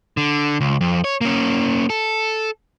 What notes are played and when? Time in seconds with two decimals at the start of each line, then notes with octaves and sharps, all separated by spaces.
0.17 D3
0.61 C#2
0.81 F2
1.04 C#5
1.21 A#3 C#4
1.90 A4